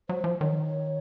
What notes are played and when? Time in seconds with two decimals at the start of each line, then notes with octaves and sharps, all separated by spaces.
0.09 F#3 C5
0.24 F3
0.40 D#3 C#5